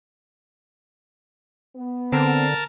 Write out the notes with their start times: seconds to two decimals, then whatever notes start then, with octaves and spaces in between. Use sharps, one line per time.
1.76 B3
2.12 D3 C4 A#4 A5